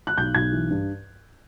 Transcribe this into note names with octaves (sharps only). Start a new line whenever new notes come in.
F#6
B1 G6
B1 G#6
E3
G2